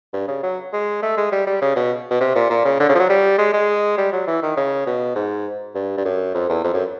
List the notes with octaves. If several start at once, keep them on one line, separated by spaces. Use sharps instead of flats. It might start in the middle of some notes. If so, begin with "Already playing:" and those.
G2
C#3
F#3
G#3
A3
G#3
G3
G3
C#3
B2
B2
C3
A#2
A#2
C#3
D3
C#3
F3
F#3
G3
G#3
G#3
G3
F#3
E3
D#3
C#3
B2
G#2
G2
G2
F#2
F2
E2
F2
F#2